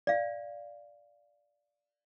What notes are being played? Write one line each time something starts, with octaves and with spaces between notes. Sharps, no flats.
D5 F5